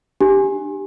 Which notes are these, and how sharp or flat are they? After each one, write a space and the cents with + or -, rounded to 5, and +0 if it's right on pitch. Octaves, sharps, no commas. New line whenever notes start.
D4 +35 G4 +0 G#5 +0